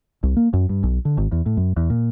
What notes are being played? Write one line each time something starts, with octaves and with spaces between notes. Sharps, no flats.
C2
A#3
F#2
G2
B1
D3
G#1
E2
A2
F#2
E2
A#2